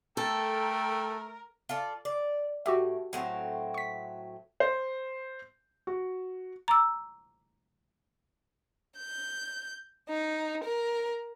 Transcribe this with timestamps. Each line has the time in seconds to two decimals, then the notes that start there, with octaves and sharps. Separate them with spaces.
0.17 A3 A4 A#4 G5
1.69 F4 A4 D5
2.05 D5
2.66 A2 F#4 G4 E5
3.13 A2 F#3 C4
3.74 C#6 B6
4.60 C5
5.87 F#4
6.68 A#5 D6 E6
8.97 G6
10.09 D#4
10.64 A#4